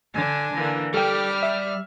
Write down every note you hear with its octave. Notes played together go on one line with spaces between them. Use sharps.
D3 D4 G#5
D3 E3 A#3
G3 G4 A4 G5 F6
E5